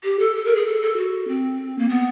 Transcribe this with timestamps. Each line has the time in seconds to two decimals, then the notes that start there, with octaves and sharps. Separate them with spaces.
0.04 G4
0.19 A4
0.36 A4
0.45 A#4
0.56 G#4
0.67 A4
0.82 A4
0.97 F#4
1.28 C4
1.79 A#3
1.89 B3